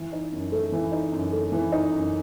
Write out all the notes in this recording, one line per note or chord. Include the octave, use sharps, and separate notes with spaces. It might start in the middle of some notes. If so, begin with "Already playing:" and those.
Already playing: E3
D#4
F#2
A3
E3
D#4
F#2
A3
E3
D#4
F#2